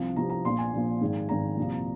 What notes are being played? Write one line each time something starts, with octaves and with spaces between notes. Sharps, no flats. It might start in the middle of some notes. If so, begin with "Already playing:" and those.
Already playing: C2 C3 F3
C2 C3 F3 A#5
A#5
A#1 A#2 F3 C6
G#5
A#1 A#2 F3
G#1 G#2 D#3
G#1 G#2 D#3 A#5
C2 A#2 F3